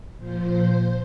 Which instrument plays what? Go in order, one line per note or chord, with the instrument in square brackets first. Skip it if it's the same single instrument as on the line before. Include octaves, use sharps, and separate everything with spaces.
[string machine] A#2 F3 C5